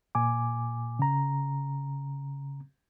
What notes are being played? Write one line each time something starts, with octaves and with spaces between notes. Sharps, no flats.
A#2 G#5 D6
C#3 A#5